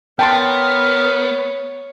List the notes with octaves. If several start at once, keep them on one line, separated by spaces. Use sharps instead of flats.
B3 A#4 C#5 G5 A5 C6